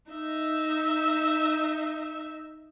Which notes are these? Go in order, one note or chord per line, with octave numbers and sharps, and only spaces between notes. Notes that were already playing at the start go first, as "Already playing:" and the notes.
D#4 E5